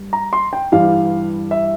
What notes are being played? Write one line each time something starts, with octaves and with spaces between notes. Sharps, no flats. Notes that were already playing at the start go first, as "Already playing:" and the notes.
Already playing: G2 G3
A#5
C6
G5
G2 E3 G3 F5
E5